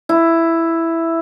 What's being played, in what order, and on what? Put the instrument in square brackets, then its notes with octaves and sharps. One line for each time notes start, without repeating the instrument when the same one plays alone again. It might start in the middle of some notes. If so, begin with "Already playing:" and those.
[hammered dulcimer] E4